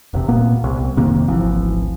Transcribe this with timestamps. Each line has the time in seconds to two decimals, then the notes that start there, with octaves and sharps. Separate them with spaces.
0.13 E1 C3
0.29 A#2 A#3 B3
0.64 C2
0.97 F1 C3 D#3 A#3
1.28 D1 G#1 E3 F3